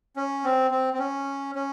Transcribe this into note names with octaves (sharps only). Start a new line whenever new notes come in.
C#4
C4
C4
C4
C#4
C#4